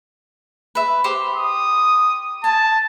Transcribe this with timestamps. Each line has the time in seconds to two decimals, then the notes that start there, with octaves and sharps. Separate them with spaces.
0.75 B4 E5
1.04 G4 C5 D6
1.36 D#6
2.44 G#5 A5